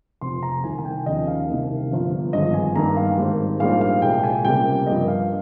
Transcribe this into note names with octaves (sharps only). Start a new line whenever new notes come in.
F1 F2 C3 C6
A#5
C2 C3 D#3 G#5
G#5
G5
D#2 C#3 F3 D#5
F5
C2 C3 D#3 A#3
G1 G2 F3
G#1 G2 F3 G#3 D#5
G#5
G2 D#3 A#3 A#5
F5
G#1 G#2 G3 A#3
A#1 G#2 G3 A#3 F5
F5
C2 A#2 G#3 G5
G#5
C#2 C3 G3 A#3 G5
G2 F3 A#3 D#5
F5